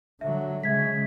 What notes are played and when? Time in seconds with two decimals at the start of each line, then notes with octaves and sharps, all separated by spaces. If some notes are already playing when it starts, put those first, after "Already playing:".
0.21 D3 F#3 E5
0.63 C#3 G#3 E5 G#6 B6